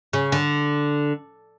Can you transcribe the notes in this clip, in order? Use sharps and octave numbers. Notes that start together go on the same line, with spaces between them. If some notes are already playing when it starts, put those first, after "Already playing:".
C#3
D3